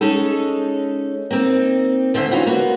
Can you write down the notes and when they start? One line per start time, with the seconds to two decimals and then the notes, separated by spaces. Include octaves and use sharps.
0.01 G#3 C#4 D#4 A4
1.31 A#3 C4 D#4
2.14 D2 D3 G#3 C5 D5 E5
2.31 D3 E3 C#4 D#4 F4 F#4
2.46 A#3 B3 F#4